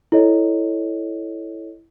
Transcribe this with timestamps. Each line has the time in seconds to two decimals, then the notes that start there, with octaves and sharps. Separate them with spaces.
0.12 E4 A4 C#5 D#5